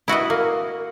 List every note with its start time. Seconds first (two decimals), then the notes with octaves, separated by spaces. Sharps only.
0.08 E4 F#4 B4 D#5
0.30 A#3